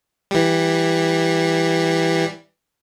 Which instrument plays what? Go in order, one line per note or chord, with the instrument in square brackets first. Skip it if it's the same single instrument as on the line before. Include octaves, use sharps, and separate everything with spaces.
[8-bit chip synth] E3 G3